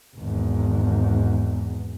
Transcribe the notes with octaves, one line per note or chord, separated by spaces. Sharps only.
G#1 E2